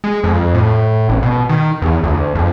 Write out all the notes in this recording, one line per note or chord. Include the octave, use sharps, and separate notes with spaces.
G#3
F2
A2
A1
B2
D#3
E2
D2
F2